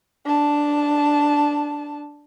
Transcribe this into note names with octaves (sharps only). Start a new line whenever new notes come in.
D4 A5